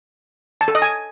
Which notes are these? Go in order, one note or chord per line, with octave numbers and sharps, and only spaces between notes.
A5
A4
D#5
G#5